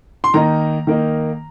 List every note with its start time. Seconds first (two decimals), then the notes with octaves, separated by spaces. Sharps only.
0.24 C6
0.34 D#3 A#3 D#4 A#5
0.87 D#3 A#3 D#4